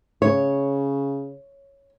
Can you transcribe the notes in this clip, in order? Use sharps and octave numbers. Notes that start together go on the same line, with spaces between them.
C#3 C#5